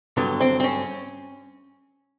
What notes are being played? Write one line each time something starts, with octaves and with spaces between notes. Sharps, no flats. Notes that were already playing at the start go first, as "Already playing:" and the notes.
G2 D3 F#3 B3
C4
C4
C#4